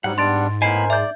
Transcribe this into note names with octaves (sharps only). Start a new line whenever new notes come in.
G#2 F#3 G3 F#5
G3 B3 D4 C6 A6 D7
A2 B3 A#4 C5 D#5 G#5 B5 C7
D5 E5 G6